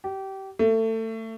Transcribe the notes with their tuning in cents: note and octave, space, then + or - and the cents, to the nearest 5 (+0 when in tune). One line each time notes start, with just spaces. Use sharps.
G4 -25
A3 +25